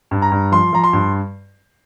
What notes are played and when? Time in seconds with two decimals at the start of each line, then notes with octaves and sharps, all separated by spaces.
0.11 G2
0.22 A#5
0.32 G2
0.52 F3 C6
0.73 F3 A#5
0.84 C6
0.93 G2